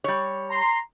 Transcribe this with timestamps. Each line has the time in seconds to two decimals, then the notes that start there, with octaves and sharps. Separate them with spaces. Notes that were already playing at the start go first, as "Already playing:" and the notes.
0.04 G3 C#5
0.50 A#5 C6